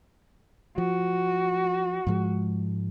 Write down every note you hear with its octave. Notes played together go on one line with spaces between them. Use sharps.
F3 F#4
G#2 F3 G#3